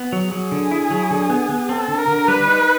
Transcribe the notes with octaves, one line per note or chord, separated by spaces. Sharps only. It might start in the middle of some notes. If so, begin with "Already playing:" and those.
Already playing: B3
F#3
G#4
F#3
D3
E4
F#3
D3
B3
B3
C4 A4
D3
A#4
D3
G3 B4
D#4